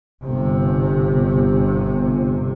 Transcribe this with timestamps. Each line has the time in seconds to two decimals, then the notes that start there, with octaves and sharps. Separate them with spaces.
0.23 G1 C3